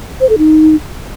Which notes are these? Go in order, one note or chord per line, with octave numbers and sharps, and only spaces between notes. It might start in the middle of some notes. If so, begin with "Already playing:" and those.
C5
A4
D#4